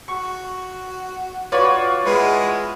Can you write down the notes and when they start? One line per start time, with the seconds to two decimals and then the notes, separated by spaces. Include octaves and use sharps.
0.08 F#4 C#6
1.52 F4 F#4 B4 C#5 D5
2.05 G#3 B3 E4 G#4 B4 C6